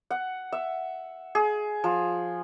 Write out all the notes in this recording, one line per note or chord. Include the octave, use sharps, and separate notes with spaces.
F#5
E5
G#4
F3